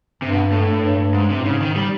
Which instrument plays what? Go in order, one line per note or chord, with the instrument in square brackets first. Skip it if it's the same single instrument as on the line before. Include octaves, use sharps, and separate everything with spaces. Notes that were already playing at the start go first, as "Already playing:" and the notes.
[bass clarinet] G2 [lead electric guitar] C3
[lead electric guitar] B2
A2
[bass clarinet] G2
[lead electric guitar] G#2
C3
[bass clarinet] A2
[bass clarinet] G#2 [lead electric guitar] C#3
[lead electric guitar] D#3
G3